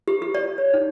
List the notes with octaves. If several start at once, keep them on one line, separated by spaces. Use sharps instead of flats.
G4
G4
D5
C#5
D#4